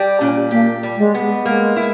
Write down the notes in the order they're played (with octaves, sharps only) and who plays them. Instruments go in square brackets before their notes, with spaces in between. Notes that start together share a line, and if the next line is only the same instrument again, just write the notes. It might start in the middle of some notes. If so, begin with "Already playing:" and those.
Already playing: [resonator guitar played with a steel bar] G3 G4
[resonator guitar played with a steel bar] A#2 [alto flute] C#4
[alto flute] A#3 [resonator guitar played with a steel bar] G4
[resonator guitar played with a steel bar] G3
[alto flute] G#3
[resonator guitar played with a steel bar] B3
[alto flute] G#3 [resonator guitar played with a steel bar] A#3
[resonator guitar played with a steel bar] E4